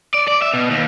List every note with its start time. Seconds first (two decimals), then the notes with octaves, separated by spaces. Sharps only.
0.14 D5
0.28 D5
0.42 E5
0.54 B2
0.71 D#2